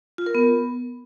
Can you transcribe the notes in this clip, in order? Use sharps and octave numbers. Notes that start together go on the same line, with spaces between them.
F4
A#4
B3